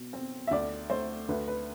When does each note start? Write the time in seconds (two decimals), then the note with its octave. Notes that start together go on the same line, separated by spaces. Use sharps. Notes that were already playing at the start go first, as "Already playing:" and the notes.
Already playing: B2
0.13 C4
0.47 E5
0.51 D2 D5
0.90 A3 C5
1.28 D2 B4
1.48 B4